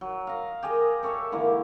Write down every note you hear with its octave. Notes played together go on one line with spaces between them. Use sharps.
F#3
D#5 F5
G4 G#4 A#4 D#5
A4 C#5 D5 E5
D3 E3 A#3